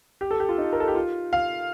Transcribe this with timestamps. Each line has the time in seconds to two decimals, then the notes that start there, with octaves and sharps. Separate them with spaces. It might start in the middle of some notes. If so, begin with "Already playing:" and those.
0.21 G4
0.31 A4
0.40 G4
0.49 F4
0.58 D#4
0.73 A#4
0.80 A4
0.88 G4
0.95 F4
1.33 F5